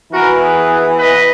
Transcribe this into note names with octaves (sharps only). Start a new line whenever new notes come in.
E3 B3 E4 F#4 A#4
G#4 B4
B4 D#5